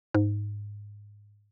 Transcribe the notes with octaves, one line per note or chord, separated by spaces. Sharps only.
G#2